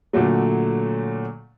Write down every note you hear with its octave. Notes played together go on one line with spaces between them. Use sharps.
A#2 D3 F#3 A3